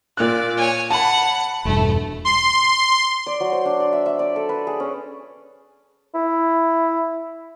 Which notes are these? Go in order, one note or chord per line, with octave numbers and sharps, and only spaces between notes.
A#2 D5 F#6
C#5 G#5
F#5 A5 B5
E1 G2 A3
C6
D5
F#3
C5
D4
D5
E5
E5
D5
A4
B4
G#4
C#4
E4